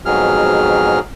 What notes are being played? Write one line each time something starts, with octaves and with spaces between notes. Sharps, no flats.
F2 G#2 B2 F#3 G#4 F6